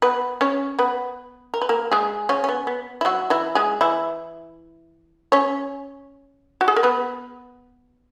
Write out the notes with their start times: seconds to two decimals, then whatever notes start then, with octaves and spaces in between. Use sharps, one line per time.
0.02 B3 B4
0.41 C#4 C#5
0.79 B3 B4
1.54 A#4
1.62 B4
1.69 A#3 A#4
1.92 G#3 G#4
2.29 C#3 C#4
2.44 C#4
2.49 B3
2.67 B3
3.01 E4
3.05 F#3 F#4
3.30 E3 E4
3.55 G#3 G#4
3.81 E3 E4
5.32 C#4 C#5
6.61 F#4
6.68 G#4
6.76 A#4
6.83 B3 B4